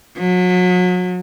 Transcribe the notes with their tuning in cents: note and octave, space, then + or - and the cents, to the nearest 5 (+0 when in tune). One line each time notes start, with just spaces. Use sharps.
F#3 -35